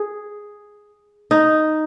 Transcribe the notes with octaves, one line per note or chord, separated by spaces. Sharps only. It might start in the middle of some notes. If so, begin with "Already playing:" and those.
Already playing: G#4
D#4